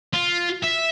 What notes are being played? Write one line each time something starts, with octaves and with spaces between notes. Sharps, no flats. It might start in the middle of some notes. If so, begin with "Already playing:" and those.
F4
E5